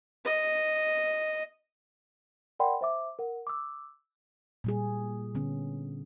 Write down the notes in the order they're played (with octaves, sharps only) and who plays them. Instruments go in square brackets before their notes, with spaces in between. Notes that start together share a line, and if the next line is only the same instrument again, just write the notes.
[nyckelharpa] D#5
[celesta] A#4 D5 F#5 G5 B5 C6
C5 E5 D6
A#4 F#5
D6 E6
[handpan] A#2 G3 G#4
D3 B3 C#4